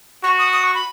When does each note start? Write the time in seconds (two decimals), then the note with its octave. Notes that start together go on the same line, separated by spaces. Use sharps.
0.23 F#4 C#6
0.39 D#6
0.53 D#6
0.64 C#6
0.75 B5